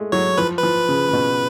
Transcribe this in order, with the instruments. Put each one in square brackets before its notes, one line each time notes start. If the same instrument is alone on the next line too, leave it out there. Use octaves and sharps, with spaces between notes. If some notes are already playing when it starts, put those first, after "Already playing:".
Already playing: [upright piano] G#3 A3
[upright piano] F#3 [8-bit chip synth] C#5
[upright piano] F3 [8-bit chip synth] B4
[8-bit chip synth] B4
[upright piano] F3
C#3
C#3
B2